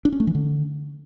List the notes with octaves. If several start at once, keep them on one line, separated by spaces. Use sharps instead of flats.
D4
C#4
A3
E3
D3